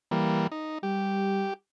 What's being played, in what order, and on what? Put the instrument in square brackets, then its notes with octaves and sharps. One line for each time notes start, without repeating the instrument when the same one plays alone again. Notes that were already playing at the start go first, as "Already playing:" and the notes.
[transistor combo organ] E3 G3 A#3
D#4
[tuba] G3 [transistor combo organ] G4